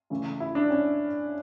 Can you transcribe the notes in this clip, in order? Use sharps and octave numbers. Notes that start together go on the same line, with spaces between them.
C#3 E3 A3
E4
D4
C#4